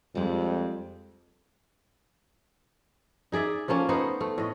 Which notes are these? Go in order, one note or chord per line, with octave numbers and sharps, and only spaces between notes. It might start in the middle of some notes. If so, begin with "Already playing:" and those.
F2 G3 G#3
D#4 G#4 D5 E5
F3 A3 A#3 C#4
B3 D#4 C5
A3
A2 D#5